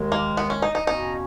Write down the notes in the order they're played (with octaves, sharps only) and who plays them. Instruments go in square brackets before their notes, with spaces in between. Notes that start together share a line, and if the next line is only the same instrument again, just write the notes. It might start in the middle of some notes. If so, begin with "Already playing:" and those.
Already playing: [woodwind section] D#2 D#3 G#3
[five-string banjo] A#3
B3
C#4
D#4
D#4
[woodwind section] E2 B2 A#3 C#4 [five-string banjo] D#4